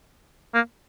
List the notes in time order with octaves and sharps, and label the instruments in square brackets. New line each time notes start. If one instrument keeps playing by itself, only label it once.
[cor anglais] A#3